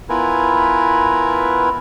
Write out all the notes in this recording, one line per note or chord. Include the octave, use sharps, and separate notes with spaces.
B3 E4 F4 A#4 B4 G#5